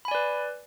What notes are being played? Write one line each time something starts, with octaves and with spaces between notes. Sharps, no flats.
B4 D5 G#5 B5